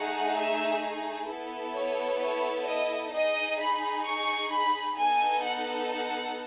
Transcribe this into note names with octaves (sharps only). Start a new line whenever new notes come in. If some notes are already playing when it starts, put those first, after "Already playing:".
Already playing: A3 D#4 G#4 F#5
E5
B3 E4 A4
C#5
C#5
D#5
D#4 G#4 D#5
B5
C#6
B5
B3 D#4 A4 G#5
F#5
F#5